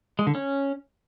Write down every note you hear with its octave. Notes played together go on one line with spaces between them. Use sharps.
G#3
D3
C#4